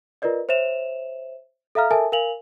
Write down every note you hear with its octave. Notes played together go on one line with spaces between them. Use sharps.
F4 A#4 B4 D5 D#5
C5 C#5 E5 E7 F7
A4 E5 F5 A#5 F6
A4 A#4 E5 G#5 A5
A#4 F5 G#5 F7 F#7